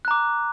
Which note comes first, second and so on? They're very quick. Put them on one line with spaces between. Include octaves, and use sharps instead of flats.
F#6 A#5 D6